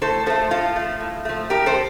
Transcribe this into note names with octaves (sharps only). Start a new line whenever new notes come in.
A2 A4 C5
F3 A3 A4 C5
A2 F4 A4
F3 A3
A2
F3 A3
A2 G4 A#4
A4 C5